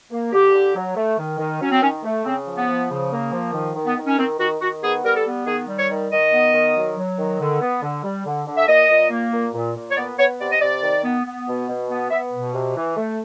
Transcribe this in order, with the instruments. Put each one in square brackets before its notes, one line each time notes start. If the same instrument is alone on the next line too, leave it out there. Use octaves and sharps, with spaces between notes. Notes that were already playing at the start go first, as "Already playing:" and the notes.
[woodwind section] A#3
D3 G4
D3
F#3
A3
D#3
D#3
F#3 C#4
C4
D#3 C#4
A3
C#3 C4
F3
B3
F3
C#3
A#3
F3
D#3
D#3
B3
D#3
C#4
D#3 C4
D#3 F#4
D#3 F#4
B3 G#4
G3 A#4
A4
B3
D#3 G#4
G3
C#5
D#3
D#3 D#5
B3
D#3
F#3
F#3
D#3
D3
B3
D3
G3
D3
D3
E5
A#2 D#5
A#2
A#3
A#2
A#2
A#2
C#5
B3 D5
B3 C#5
C3 D5
D#5
C3 D5
D#3
B3
B3
B2
B2
B3
B3 E5
B2
C3
E3
A3